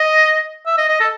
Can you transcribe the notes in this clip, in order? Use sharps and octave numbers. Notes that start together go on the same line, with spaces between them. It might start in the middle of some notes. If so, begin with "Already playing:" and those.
Already playing: D#5
E5
D#5
D#5
A4